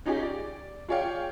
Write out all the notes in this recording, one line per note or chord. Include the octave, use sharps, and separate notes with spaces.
C#4 D#4 F4 G4 G#4
D5
F4 G#4 C#5 D5 F5 G5